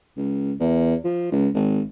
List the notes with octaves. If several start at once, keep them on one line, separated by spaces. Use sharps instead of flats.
C#2
E2
F3
C#2
G#1